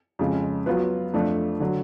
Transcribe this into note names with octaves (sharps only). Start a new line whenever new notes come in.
F2 C#3 G#3
F#3 B3 F4 B4
F2 F3 A3 D4
D3 F#3